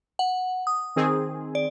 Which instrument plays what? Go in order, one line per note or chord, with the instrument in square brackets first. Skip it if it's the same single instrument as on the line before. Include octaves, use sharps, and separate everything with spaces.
[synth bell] F#5
D#6
[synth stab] D#3 C4 G#4
[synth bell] D5